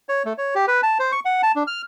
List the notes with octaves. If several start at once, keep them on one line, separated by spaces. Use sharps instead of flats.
C#5
A3
C#5
G4
B4
A5
C5
C#6
F#5
A5
D4
F6